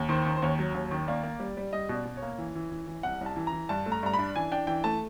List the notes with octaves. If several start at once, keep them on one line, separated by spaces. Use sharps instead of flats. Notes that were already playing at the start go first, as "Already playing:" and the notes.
Already playing: D#2
D#3 C5
D#3
C5
D#2 C#5
F#3
D#2
D#3
A#3 D5
A#3
G3
G3
G3 D#5
B2
D5
B2
C#5
A#3
E3
E3
E3
E3
C2 F#5
C2
A5
E3
A#5
E3
G2 A5
A3
A#5
G2 A#5
B5
D4
E3 G#5
D4 G5
E3 G5
A3 A5